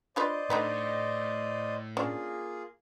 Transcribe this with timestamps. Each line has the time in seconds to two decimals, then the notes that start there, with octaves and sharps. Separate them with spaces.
0.16 D4 F4 B4 C5 D5 D#5
0.50 A2 D3 D#4 B4
1.97 A#3 C#4 D4 F4 G#4